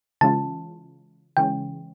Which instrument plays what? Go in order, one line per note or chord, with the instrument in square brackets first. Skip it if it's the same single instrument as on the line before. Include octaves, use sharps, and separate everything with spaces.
[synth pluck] C#3 E3 G#3 C#4 F4 [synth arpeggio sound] A5
[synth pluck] C#3 E3 G#3 C#4 [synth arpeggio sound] G5